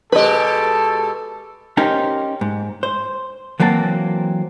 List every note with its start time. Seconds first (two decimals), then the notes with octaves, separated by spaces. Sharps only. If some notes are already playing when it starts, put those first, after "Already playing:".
0.12 B2 G#3 G4 A4 B4 D#5
1.77 C#4 D#4 G4 A#4 C5
2.41 G#2
2.83 C5
3.60 E3 F#3 A#3 C4 A5